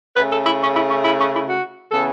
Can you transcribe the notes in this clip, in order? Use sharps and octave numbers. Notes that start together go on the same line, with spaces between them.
C#3 A3 B4
A4
E4
C#4
E4
C#4
E4
C#4
E4
F#4
C#3 E3 B3 A4